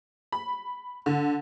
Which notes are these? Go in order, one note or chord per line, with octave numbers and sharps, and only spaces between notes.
B5
D3